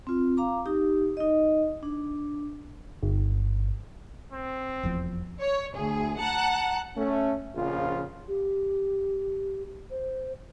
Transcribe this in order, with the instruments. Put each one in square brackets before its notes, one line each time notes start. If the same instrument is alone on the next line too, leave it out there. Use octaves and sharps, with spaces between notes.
[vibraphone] C4 F4
F5 A#5 D6
D#4 G4
D#4 D#5
D4
[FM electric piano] G1
[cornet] C4
[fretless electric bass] F1 E2 F3
[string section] C#5
D2 G#4
F#5 A5 A#5
[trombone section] A3 C#4
A#1 C#3 F3 F4
[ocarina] G4
C5